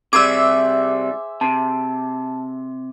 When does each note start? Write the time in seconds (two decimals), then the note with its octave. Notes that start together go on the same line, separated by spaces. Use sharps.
0.13 C3 G3 G#4 C5 E5 D6 E6
1.41 C3 A5